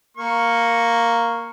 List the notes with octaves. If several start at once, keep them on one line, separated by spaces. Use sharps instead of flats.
A#3 C#6